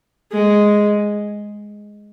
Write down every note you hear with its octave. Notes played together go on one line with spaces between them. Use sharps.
G#3